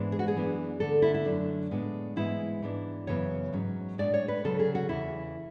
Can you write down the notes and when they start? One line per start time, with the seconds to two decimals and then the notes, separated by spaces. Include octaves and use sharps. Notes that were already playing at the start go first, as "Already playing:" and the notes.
Already playing: G#2 E3 G#3 B3 D4
0.12 G#4
0.19 F#4
0.28 G#4
0.35 F#2 E3 B3 D4
0.80 D2 D3 A3 D4 A4
1.02 E4
1.14 E4
1.25 F#2 D3 F#3 A3 D4
1.71 A2 G#3 B3 D4
2.16 G#2 E3 G#3 B3 E4
2.62 G#2 E3 B3 D4
3.07 F#2 C#3 E3 B3 C#5
3.53 G#2 F#3 C#4
3.98 A2 G#3 D4 D5
4.14 C#5
4.28 B4
4.44 D2 C#3 F#3 C#4 A4
4.59 G#4
4.75 F#4
4.89 E2 C#3 E3 E4